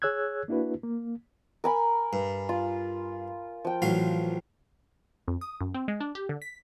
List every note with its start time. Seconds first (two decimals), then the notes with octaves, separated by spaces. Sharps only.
0.02 G#4 C#5 E6 F#6 G#6
0.48 A#3 D4 E4 F#4 B4
0.83 A#3
1.64 A#4 G#5 B5
2.13 G2
2.49 F4
3.65 F3 G5
3.82 A1 F#3 F5
5.28 F2
5.41 D#6
5.61 F#2
5.74 C4
5.88 G#3
6.00 D4
6.15 G4
6.29 D3
6.42 B6